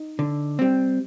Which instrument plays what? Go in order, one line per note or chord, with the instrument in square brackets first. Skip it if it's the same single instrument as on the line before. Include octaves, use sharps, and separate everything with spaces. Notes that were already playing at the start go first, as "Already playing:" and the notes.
Already playing: [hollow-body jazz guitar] D#4
D3
G3 C4